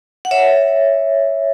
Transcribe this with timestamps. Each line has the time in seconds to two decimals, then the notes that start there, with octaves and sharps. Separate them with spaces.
0.25 F#5
0.31 C#5 E5